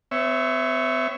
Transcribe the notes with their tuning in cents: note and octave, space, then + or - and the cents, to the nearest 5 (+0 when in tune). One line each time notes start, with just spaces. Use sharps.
C4 -45 C#5 +0 E5 +0